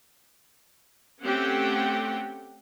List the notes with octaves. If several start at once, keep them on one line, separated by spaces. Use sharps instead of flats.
A3 C4 C#4 G4 F#5 G5